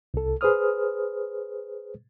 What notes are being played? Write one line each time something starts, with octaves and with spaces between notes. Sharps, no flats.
C2 A4
G#4 B4 C5 D#6 F6